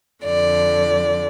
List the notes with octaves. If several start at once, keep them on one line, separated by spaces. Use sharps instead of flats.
F2 D3 D5